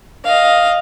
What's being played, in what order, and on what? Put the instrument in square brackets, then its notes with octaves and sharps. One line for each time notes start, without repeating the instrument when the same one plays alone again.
[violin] D#5 F5